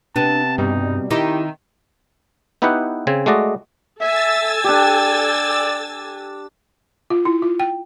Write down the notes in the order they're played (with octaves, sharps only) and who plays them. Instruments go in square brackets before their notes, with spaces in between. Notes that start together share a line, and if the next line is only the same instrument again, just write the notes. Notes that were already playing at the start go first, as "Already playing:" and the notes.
[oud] C3 B3 [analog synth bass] D4 [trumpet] A5
[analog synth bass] G2 [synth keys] B2 G3 [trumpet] D#4
[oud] D#3 D#4 [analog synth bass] E4 [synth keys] G4 [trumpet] E5
[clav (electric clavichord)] B3 D#4 E4 G4 B4 F#5
C#3 C4 G#5
G#3 A3 F#4 D5 D#5
[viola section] A4 G#5 [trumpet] E5 [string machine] E6 A6
[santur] D4 G4 [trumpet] D5
[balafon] F4
E4
F4
G5